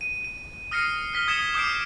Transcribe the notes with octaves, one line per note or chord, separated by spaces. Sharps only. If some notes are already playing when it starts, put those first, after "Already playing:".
D#7
D#7
D#6 F6 A#6 C7 C#7 D#7
F6 B6 G7
D#6 G#6 B6 C#7 E7
D6 D#6 G6 C7 D7